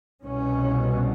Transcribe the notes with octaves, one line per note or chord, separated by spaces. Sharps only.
C2 B2 C#4